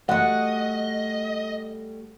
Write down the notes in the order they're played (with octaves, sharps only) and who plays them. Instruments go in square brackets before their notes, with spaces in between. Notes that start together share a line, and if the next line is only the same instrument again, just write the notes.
[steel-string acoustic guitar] G3 A3 [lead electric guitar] D#5 [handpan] F#5